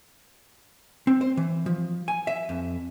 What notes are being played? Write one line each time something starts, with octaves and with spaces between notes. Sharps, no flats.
C4
C5
E3
F3
G#5
E5
F2